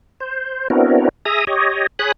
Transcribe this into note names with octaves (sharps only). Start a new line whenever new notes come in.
C5
B3 C4 D4 E4 F#4 A#4
G#4 E5 A#5 D#6
G4 C#5 D#5
G#4 C#5 B5 D#6 F#6